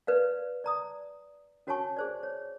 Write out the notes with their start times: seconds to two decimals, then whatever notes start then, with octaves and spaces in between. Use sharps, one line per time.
0.07 B4 D5 F5
0.64 D5 A#5 D#6
1.67 C#4 F#4 C#5 G#5 A5 C#6
1.96 G#4 C5 D5
2.23 C#5